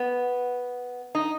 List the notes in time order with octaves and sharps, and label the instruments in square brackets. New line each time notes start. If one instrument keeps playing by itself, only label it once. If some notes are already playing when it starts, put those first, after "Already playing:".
Already playing: [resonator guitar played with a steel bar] B3
D#4